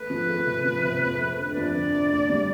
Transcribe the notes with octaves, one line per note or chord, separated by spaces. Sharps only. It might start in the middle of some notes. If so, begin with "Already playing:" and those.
Already playing: A3 B4
F3
A3
C3
F3
C3
F2
A3
D3
F2 D5
D3
D3
D2
G3